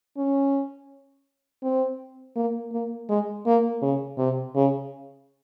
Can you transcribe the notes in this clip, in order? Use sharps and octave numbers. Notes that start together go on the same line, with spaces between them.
C#4
C4
A#3
A#3
G#3
A#3
C#3
C3
C#3